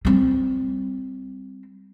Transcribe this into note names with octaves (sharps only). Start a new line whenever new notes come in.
G3 C4